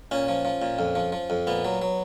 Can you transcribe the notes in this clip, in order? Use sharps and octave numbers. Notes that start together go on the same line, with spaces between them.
A#2 C#4
F3
F3
A#2
F2
F3
F3
F2
A#2 B3
F#3
F#3